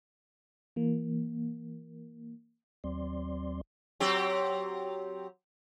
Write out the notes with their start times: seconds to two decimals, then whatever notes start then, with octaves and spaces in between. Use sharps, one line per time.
0.76 E3 A#3
2.84 D#2 F#3 C4 D5 C6
4.00 F#3 C4 G4